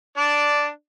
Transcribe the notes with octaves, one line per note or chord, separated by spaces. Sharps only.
D4 D5